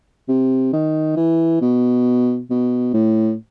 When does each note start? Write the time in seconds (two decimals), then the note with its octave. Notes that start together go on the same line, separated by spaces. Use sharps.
0.28 C3
0.73 D#3
1.17 E3
1.61 B2
2.50 B2
2.94 A2